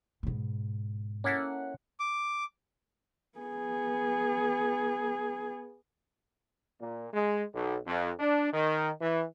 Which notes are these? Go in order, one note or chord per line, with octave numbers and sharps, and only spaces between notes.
G#2 B2
A#3 C#4 E4 A4 F#5
D6
B3 G#4
A#2
G#3
B1
F2
D4
D#3
E3